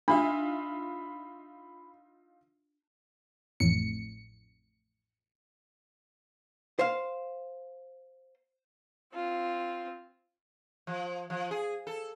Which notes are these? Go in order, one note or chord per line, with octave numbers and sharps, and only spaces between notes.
D4 D#4 F4 E5 B5
A1 F2 A2 C#7
C5 F5
C4 F4
F3
F3
G#4
A4